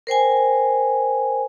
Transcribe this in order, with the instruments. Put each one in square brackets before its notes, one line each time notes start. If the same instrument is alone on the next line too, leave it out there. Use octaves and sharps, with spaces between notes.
[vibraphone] A#4 C5 G5 G#5